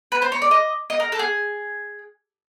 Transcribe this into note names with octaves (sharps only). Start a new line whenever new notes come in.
B4
C5
C#5
D5
D#5
D#5
A#4
A4
G#4